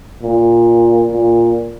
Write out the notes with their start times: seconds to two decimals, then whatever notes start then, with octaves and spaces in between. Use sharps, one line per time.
0.23 A#2
1.12 A#2